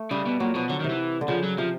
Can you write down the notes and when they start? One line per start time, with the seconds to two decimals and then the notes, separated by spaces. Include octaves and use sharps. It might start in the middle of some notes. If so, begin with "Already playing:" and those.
Already playing: A3
0.11 C#3 G3
0.26 B2
0.40 A#2 F#3
0.55 B2 F3
0.69 D3 F#3
0.80 D#3
0.84 C3
0.90 E3
1.21 D3
1.28 C#3 F3
1.43 F#3
1.58 C3 F3